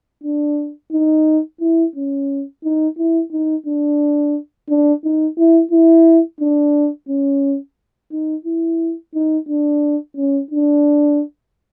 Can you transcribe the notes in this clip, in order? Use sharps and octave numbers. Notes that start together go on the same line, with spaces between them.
D4
D#4
E4
C#4
D#4
E4
D#4
D4
D4
D#4
E4
E4
D4
C#4
D#4
E4
D#4
D4
C#4
D4